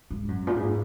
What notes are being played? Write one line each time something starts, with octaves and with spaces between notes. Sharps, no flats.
G#2
F#2
A#2
G#2